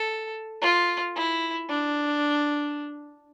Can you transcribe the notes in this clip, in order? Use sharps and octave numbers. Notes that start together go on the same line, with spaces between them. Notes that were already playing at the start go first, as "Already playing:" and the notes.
Already playing: A4
F4
E4
D4